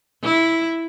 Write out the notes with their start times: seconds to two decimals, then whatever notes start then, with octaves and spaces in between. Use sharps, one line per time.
0.24 E4